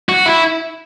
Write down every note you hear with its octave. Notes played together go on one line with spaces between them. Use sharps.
F#4
E4